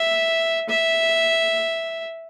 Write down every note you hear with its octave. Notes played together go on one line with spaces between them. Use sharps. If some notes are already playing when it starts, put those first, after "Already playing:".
Already playing: E5
E5